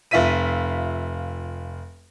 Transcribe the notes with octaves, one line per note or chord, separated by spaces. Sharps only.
F1 F4 E5 B6 D#7